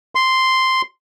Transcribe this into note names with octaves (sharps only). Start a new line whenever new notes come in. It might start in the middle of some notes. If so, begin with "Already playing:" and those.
C6